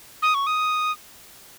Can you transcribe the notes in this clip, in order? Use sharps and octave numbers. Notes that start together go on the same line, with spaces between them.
D#6
C#6
D#6